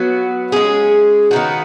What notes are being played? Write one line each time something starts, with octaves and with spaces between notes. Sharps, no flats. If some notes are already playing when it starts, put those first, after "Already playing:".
Already playing: F#3 B3 F#4
G#3 C#4 G#4
D#3 B3 D#4 F#4